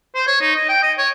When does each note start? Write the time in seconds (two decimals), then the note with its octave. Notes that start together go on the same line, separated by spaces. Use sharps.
0.15 C5
0.27 C#5
0.41 D#4
0.56 D#5
0.69 G5
0.83 D#5
0.98 C#5